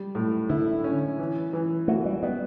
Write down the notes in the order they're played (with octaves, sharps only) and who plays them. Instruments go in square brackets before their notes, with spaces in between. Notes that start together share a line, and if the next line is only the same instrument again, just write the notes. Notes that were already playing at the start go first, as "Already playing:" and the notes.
Already playing: [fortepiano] G3
A2
[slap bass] D3 [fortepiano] E4
[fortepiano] C#4
E3
E3
[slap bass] A3 [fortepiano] F#4
[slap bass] G3
[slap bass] G3 [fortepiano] B3